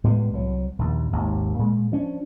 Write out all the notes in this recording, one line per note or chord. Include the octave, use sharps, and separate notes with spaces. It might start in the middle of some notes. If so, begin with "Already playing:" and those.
A2 G3 G#3 B3
C2 F#3
A#1 D#2
G#1 D#2
A#2 G#3
F3 C#4 D4